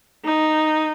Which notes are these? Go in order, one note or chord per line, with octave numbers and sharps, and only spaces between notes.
D#4